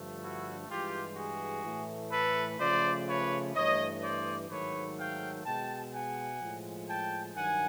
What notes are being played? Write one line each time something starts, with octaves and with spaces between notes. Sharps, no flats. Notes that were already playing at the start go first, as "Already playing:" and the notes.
Already playing: G2 D3 F3 A3
E4 F#4
G2 E3 G#3 F4 G4
F#4 G#4
A2 E3 A3
A4 B4
C#3 F3 A3 C5 D5
B4 C#5
G2 E3 A3 C#5 D#5
C5 D5
G#2 D#3 F#3 A3 B4 C#5
F5 G5
B2 G#3 G5 A5
F#5 G#5
A2 F3 G#3
G5 A5
G2 D#3 F#3 F#5 G#5